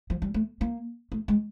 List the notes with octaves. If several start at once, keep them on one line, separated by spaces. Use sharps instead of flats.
F3
G3
A3
A#3
A3
G#3